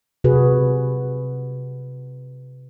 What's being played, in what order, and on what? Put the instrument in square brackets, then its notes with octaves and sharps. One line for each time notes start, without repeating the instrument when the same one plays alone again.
[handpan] C3 F#4 G#4 B4